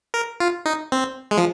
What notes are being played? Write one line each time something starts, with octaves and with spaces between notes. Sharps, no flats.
A#4
F4
D#4
C4
G#3
F3